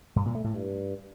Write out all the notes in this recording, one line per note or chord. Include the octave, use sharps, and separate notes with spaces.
G2
A#2
A3
A2
G2